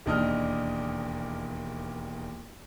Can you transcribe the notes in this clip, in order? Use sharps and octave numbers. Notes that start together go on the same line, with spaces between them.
E1 D#2 D4 D#5 D#6 F6